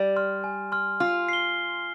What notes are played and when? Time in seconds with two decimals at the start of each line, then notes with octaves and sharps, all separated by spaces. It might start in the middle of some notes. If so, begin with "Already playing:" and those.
Already playing: G3
0.16 C6 F6
0.44 G#5
0.72 C6 F6
1.00 F4 F6
1.29 C7 G7